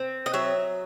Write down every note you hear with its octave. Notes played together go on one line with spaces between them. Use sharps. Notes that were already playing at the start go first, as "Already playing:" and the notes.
Already playing: C4
D#5
F#3 E5